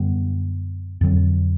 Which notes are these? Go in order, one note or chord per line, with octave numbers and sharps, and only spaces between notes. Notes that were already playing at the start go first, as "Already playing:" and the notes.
Already playing: F#2 D3 G3 B3
F2 D3 F#3